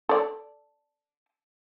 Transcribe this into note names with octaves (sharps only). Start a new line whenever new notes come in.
A4 D5